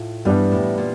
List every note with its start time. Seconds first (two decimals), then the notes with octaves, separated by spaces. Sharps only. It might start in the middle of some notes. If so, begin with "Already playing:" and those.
Already playing: A2 F4
0.25 G2 E3 G3 B3 D4
0.52 A2
0.78 A#2